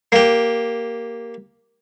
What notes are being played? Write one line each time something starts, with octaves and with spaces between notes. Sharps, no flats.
A#3 G4